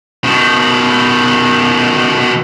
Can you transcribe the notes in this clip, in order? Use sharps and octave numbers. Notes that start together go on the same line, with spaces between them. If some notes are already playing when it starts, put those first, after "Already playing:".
B2 D#3